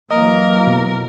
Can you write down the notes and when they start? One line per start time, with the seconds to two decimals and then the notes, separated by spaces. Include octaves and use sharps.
0.11 F2 E3 F#3 A#3 A#4 D#5
0.67 B2